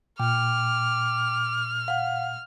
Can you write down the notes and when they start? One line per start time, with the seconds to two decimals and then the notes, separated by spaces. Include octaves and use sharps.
0.20 A#2 G5 D6 F6
1.88 F5 F#5